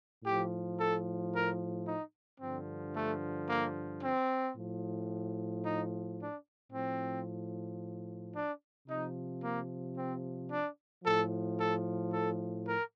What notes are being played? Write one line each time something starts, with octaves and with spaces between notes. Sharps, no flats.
A2 F3 G4
A4
A#4
D#4
G2 D3 F3 C4
A3
A#3
C4
A2 F3
D#4
D4
A2 F3 C4
D4
C3 F3 D#4
A#3
C4
D4
A2 F3 A4
A4
A4
A#4